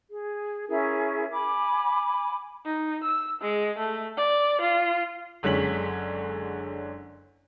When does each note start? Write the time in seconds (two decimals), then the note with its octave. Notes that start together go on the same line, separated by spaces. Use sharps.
0.10 G#4
0.69 C#4 E4 G#4 A#4
1.31 G#5 B5 D6
2.65 D#4
3.03 E6
3.42 G#3
3.78 A3
4.17 D5
4.61 F4
5.43 F#1 D3 G#3 C#4 B6 F#7